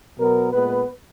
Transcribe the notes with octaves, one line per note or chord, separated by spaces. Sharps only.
B2 F#3 B3 A#4
A#2 G#3 B3 B4